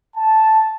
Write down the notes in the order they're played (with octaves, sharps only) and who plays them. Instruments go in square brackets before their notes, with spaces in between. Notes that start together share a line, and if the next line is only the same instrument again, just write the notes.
[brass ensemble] A5